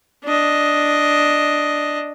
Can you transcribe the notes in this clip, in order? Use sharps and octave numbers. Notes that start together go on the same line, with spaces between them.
D4 D#5